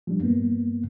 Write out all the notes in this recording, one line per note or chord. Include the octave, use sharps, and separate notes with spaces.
F3 G3 D4
G2 A#3 B3